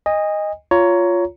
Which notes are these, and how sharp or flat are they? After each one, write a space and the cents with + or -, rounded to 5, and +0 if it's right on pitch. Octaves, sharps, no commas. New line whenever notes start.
D#5 +0 G#5 -35
F4 +0 C#5 +15 A#5 +0